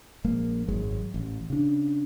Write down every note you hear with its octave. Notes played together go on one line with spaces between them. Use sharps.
A#1 G#3 A#3
G#1 F#2 F#3 G#3
A1
C#3 D4